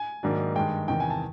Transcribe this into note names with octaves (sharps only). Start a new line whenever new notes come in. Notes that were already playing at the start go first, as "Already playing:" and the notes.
Already playing: G#5
G#2 D#3 F#3 A#3 D4
G2 D#3 G#3 G5
E2 C3 D#3 G5
G#5
A5